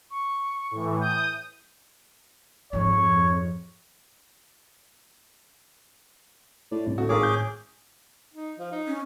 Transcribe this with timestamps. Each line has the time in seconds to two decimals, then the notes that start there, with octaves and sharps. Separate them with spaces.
0.11 C#6
0.71 A2 E3
1.01 D#6 G6
2.73 F2 G#2 F3 C#5
6.71 A2 D5
6.87 C2 A2
6.98 D2 A3 F#4
7.09 G#1 C#4 F4 G#4 A#4 C#5 D6
7.23 G6
8.34 D#4
8.59 F3
8.72 D#4
8.87 C#4